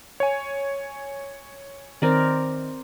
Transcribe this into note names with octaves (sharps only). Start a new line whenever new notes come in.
C#5 G#5
D#3 C4 A#4 D5